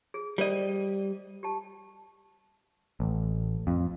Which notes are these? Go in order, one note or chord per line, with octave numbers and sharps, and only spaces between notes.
G#4
G3 A#4 C5 D5 D#5
G4 A5
A1
F2